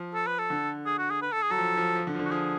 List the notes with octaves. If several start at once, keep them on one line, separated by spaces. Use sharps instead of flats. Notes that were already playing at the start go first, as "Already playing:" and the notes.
Already playing: F3
A4
B4
A4
D3
G#4
F#4
G#4
B4
A4
G#4
F#3 A4
F3
F3
F3
D3
F3
D3
F#4
F3 G#4